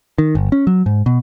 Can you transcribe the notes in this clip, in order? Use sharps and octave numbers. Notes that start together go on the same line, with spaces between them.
D#3
G1
C#4
F#3
G#2
B2